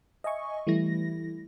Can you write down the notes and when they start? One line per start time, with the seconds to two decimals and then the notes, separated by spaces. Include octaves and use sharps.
0.24 D#5 E5 G#5 C#6
0.67 E3 G3 A3 E4 A#6